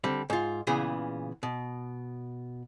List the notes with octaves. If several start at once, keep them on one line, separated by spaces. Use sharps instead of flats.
D3 G3 C4
G#2 F4
A#2 C#3 E3 B3 G#4
B2